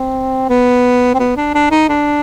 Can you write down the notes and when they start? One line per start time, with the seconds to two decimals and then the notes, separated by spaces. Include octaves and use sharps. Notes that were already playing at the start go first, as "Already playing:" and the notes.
Already playing: C4
0.49 B3
1.14 C4
1.19 B3
1.37 D4
1.54 D4
1.71 D#4
1.89 D4